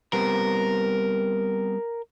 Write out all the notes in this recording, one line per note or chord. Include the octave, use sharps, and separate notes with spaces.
G3 B3 C4 A#4